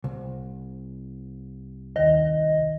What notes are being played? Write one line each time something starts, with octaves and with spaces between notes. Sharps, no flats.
C2
D#2 D#3 D#5